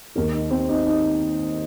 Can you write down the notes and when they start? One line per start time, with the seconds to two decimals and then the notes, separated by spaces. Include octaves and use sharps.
0.16 D#2 D#3 A#4
0.34 D#4
0.51 C4
0.69 D#4
0.86 D#4